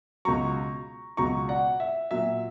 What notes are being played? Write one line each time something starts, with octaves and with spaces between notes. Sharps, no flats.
C#2 B2 F#3 A#5 C#6
C#2 B2 F#3 A#5 C#6
D5 F#5
E5
A#2 F#3 E5